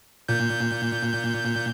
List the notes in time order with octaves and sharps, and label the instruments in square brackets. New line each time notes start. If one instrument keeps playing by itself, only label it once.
[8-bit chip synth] A#2 G6